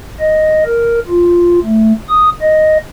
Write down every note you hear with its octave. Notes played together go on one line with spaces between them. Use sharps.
D#5
A#4
F4
A3
D#6
D#5